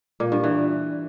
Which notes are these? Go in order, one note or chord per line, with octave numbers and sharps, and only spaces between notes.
A#2
G2
E3